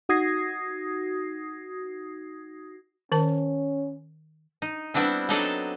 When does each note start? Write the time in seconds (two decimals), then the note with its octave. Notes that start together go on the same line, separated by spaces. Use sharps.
0.09 D#4 F#4 D#6 G#6 A#6 C7
3.12 D#3 C#4 A#4 A5
4.62 D#4
4.94 G3 B3 C4 D4 E4
5.29 F#3 D4 D#4 A4 D5 D#5